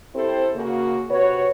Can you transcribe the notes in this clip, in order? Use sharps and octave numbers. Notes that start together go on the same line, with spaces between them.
C4 E4 G4 A4 C5
C#3 A#3 F#4
C3 F#4 B4 C#5